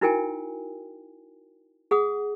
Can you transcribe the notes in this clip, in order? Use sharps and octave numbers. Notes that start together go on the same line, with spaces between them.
D#4 E4 F#4 A#4 G5 G#5
G#4 F#5 D#6